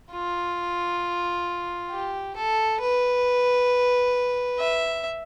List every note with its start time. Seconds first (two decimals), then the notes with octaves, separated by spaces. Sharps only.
0.12 F4
1.91 G4
2.36 A4
2.81 B4
4.59 E5